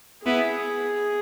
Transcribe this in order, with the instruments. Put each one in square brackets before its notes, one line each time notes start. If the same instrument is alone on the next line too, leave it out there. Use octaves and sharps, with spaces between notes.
[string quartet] B3 E4 [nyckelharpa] G#4